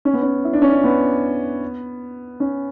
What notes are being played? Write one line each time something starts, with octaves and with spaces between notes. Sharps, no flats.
C#4
B3
C#4
E4
D4
C#4
D4
B3
C#4